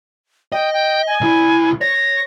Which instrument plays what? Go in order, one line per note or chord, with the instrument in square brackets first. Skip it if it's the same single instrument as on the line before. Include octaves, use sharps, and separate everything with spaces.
[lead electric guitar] D#5 [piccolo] G5
[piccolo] G5
G#5
[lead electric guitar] C2 E4
[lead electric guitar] C#5 [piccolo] A#6